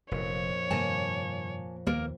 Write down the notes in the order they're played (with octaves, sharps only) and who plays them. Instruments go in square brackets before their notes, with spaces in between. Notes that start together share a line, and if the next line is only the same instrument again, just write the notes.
[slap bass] F1 [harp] F2 A#2 [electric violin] C#5
[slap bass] G2 C3 D#3 [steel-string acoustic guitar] A#3 G#5 A5
[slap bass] D#2 [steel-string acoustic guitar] A#3 A#4